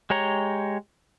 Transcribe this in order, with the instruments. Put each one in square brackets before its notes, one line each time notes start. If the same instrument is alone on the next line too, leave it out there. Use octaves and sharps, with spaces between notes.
[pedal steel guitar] G#3 G4 C#5 A#5